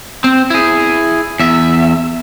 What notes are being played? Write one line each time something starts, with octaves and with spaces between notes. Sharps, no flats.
C4
E4 G#4
E2 E5